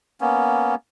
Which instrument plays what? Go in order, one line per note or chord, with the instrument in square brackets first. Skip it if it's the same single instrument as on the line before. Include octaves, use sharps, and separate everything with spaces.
[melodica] A#3 B3 C#4